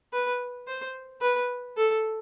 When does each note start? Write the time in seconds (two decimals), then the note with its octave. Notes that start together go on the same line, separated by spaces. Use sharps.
0.13 B4
0.68 C5
1.22 B4
1.77 A4